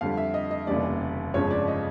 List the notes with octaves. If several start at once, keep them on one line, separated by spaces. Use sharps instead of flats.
F2 D3 G3 F5
E5
D#5
D#5
F1 D#2 C#3 E3 G3 D5
G1 F2 C#3 F3 G#3 C#5
D5
D#5